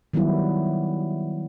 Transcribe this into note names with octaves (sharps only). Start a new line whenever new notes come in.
D#3 F#3 G3 B3 E4